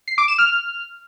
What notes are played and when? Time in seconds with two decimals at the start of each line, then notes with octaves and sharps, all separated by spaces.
0.08 C7
0.18 D6
0.28 E7
0.38 F6